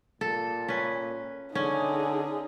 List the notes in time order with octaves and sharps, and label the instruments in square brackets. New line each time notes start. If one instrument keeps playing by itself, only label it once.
[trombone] A#2 [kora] A4
[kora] C#4 B4
[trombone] D3 [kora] C#4 [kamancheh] D#4 G#4